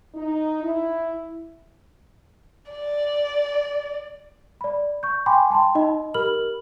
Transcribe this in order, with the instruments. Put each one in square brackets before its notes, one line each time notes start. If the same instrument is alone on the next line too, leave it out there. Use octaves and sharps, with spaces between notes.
[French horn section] D#4
E4
[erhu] D5
[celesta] D5 B5
C#6 G6
G5 G#5 B5 C6 D6
G5 A5 B5 C6
D#4 D#5 B5
G4 A#4 B5 F6 F#7